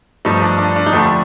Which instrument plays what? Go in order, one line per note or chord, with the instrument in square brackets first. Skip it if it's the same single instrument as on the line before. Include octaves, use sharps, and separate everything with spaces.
[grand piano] G2 F3 A3 D#4
D4
D4
D4
D#4
F2 D3 F3 A3 D4